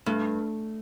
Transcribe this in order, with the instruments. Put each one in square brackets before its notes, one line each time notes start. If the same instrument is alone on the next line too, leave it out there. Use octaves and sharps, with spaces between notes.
[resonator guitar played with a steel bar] G2 [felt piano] A3